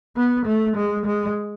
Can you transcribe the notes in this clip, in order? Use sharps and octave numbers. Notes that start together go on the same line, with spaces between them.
B3
A3
G#3
G#3